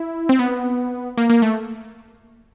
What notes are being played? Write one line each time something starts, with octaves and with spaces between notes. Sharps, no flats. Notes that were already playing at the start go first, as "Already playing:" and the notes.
Already playing: E4
C4
B3
A#3
A#3
A3